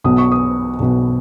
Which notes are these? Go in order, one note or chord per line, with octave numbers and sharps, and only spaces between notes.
B1 B2 D#6
C#6
D#6
B1 B2